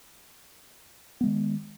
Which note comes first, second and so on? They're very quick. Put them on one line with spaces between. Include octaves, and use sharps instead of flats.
B3 G#3 D#3